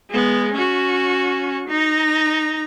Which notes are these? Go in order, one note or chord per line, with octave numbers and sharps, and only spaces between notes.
G#3 B3
C#4 F#4
D#4 A#5